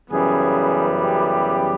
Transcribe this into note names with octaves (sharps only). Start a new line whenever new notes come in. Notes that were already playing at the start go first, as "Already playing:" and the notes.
F#2 C#3 E3 G3 B3 G#4
G4